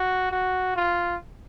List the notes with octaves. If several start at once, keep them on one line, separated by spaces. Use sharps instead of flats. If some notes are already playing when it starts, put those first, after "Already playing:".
Already playing: F#4
F#4
F4